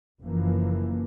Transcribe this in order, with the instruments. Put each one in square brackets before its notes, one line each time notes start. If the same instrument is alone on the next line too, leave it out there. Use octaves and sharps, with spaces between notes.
[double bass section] F#1 F#2 E3 F3 A#3